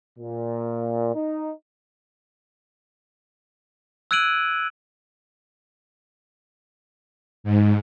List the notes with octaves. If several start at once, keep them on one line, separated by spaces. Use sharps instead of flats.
A#2
D#4
E6 F#6 G#6 D7 D#7 F#7
G#2